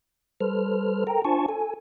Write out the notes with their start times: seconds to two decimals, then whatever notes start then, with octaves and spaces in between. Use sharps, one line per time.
0.41 G3 A4 B4 C5 F6
1.07 A4 A#4 G5 A#5
1.25 D4 F4 C5 G#5 A5 C#6
1.49 A4 G#5